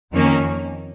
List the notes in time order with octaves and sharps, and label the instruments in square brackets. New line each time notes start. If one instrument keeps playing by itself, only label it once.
[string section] F2 D#3 A#3 C#4